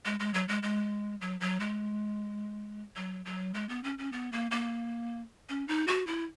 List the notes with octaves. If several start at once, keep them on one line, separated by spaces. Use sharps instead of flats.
G#3
G#3
F#3
G#3
G#3
F#3
F#3
G#3
F#3
F#3
G#3
B3
C#4
C#4
B3
A#3
A#3
C#4
D#4
F#4
E4